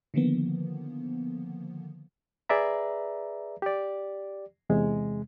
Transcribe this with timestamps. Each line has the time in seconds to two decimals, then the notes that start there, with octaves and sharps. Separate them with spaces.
0.14 D3 D#3 F3 A#3 B3
2.49 G#4 B4 D5 E5 A#5
3.62 G4 D5
4.70 E2 C3 G#3